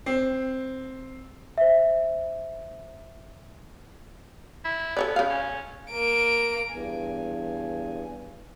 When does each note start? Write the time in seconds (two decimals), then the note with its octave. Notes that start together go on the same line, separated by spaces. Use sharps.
0.06 C4
1.58 C5 E5
4.65 E4
4.97 B3 A4 C#5 D5
5.16 C#3 F5
5.30 C#4
5.92 A#3 D7
6.70 E2 G2 G#5